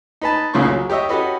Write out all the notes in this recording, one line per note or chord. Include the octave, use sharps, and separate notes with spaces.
D#4 B4 A5
C2 F2 C#3 A#3 C5 C#6
F#3
G4 C#5 D#5 E5
C#4 F#4 G4 A4 B4 D#5